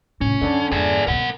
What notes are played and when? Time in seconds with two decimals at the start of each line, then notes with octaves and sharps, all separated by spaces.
0.21 F1 A2 C#4
0.42 F#2 D3 D4
0.72 F2 G#2 G#4 D5
1.07 F#2 B2 A#4 F#5